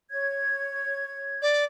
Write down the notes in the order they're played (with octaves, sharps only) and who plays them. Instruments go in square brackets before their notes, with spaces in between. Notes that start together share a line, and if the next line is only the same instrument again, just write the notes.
[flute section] C#5 G#6
[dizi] D5